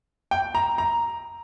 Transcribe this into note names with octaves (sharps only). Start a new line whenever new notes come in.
G5
A#5
A#5